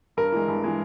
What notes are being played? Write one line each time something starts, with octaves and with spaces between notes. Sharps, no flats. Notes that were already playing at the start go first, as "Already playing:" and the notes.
G2 A#4
E3 G#3
G2
E3 G#3